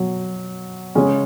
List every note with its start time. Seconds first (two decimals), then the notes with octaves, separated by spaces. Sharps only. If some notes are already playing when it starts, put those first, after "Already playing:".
Already playing: B2 F#3
0.95 C#3 G#3 C#4